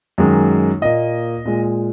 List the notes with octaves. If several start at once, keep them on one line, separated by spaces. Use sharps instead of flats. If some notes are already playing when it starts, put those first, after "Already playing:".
F#2 D#3 G#3
A#2 A#3 D#5
A#2 G#3